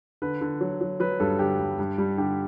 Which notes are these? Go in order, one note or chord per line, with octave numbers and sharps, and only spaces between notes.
D3 B4
D3
F#3
F#3
F#3 B4
G2 A4
D3 G4
G2
G2
G3
D3 G4